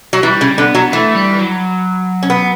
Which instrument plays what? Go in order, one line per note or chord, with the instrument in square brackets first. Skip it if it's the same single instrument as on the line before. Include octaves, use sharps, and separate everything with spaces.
[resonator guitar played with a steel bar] F#3
[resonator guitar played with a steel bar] E3 [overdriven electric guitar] G3
[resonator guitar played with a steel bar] C#3
[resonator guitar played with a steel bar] D3 [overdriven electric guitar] B3
[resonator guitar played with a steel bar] F#3
[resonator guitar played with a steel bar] E3 [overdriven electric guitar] A3
[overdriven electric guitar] G3
F#3
[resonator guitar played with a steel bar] C#4
B3